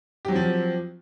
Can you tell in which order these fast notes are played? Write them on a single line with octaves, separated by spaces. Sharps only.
G4 F#3 C4 F3